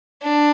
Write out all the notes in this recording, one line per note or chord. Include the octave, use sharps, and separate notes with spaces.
D4